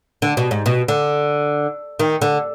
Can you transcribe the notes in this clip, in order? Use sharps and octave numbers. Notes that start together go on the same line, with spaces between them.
D3
B2
G#2
B2
D3
D#3
D3